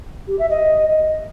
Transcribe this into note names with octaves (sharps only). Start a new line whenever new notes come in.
G4
E5
D#5